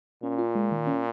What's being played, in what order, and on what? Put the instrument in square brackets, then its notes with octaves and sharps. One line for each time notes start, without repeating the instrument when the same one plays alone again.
[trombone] A#2 [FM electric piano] C#4
[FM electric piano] F4
G#3
D#3
C#4